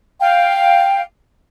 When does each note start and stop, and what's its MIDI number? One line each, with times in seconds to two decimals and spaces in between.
0.19 1.00 77
0.19 1.00 79